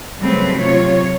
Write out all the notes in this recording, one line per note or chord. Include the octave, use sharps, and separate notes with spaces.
C#3 F#3 G3 A3 C4 B4
C3 F#3 F4 C#5